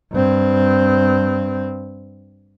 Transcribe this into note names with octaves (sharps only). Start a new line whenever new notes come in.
G2 C4